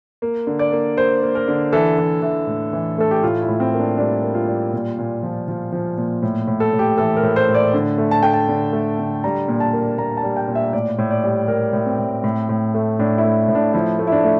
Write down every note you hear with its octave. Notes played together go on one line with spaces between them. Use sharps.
A#3
D3
D5
A#3
A#3 C5
A#3
A#4
D3
E3 A4
E3
E3
A2
E3
A3 A4
G4
A2 F4
E4
A2
C4
A#3
D4
G3 D4
A#3
F4
G3
A#2
A#2
F3
F3
F3
A#2
A2
A2
A4
A2
G4
E3 A4
A#4
A2
C5
A2
D5
D3
A3
A5
A3 G5
A5
D3
A3
D3
G3 A#5
A#2
A5
A#3
A#2 A#5
A5
G3
G5
A#2
E5
A2 D5
A2
D5
G3
G3 A#4
A2
C4
A2
A2
A2
A3
A2 D4
E4
A3
A2
D4
F3 E4
A3
E4
D4
A3